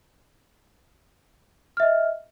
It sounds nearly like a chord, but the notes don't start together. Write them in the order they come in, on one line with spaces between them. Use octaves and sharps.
F6 E5 D#5